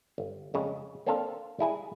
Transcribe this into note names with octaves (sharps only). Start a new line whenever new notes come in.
G1
F2 C#3 G#3
A#3 C4 D4 A4 C5 F5
G3 E4 G#4 G#5